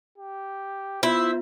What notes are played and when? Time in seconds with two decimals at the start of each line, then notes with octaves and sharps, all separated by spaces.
0.18 G4
1.03 B3 E4 F4 C5 E5